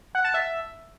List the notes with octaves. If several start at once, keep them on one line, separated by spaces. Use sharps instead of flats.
F#5
A5
E5